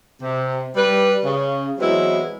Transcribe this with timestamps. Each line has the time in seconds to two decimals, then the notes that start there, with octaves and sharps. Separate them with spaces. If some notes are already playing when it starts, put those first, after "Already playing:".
0.21 C3
0.76 G3 B4
1.24 C#3
1.79 E3 F#3 G#3 B3 C4 E4